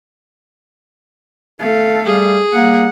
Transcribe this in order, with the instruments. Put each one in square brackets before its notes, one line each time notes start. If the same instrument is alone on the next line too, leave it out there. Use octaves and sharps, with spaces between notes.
[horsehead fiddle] A3 F5 [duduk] A4
[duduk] G3 [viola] G#4
[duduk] G3 [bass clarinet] A#3 [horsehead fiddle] F#5